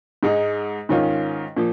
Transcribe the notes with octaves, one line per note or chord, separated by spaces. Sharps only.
G#2 G#3 D#4
G#2 D#3 C#4 F4
A#2 F3